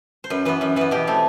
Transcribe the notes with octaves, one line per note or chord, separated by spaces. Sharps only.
C5
F#2 B4
E3 B3 B4
F#2 B4
E3 B3 B4
B2 G4
A3 C4